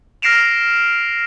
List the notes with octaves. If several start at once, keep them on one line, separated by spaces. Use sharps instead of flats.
F6 A#6 C7 D7 E7 F7